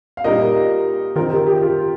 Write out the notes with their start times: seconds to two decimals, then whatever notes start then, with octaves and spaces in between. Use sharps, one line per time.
0.17 F5
0.24 A#2 G3 D#4 A#4 D#5
1.16 D#3 C4 D#4 F4 A#4
1.31 G4
1.46 G4
1.62 F4